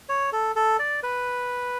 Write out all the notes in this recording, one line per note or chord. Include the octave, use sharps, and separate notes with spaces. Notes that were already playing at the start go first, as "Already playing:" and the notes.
C#5
A4
A4
D5
B4